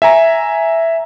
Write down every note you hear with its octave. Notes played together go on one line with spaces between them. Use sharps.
E5 G#5 A#5